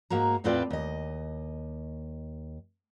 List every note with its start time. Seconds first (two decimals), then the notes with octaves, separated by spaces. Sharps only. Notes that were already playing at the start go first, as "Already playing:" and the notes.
0.10 G#2 A#3 F#4 A#5
0.44 E2 A2 C4 F4 B4 D5
0.70 D#2 D#5